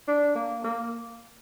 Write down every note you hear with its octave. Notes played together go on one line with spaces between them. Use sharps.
D4
A#3
A#3